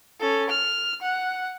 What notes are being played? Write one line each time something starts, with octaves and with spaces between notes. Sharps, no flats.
C#4 A4
F6
F#5